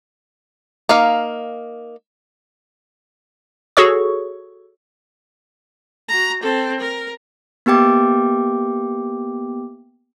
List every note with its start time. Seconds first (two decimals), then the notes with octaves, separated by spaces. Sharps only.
0.89 A#3 D#4 F5
3.77 F#4 G#4 A4 C#5 C#6
6.08 F#4 A#5
6.43 C4 A4
6.80 A#4
7.66 A#3 B3 G4 G5 D6